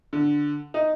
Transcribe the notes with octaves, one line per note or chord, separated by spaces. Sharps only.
D3
D#4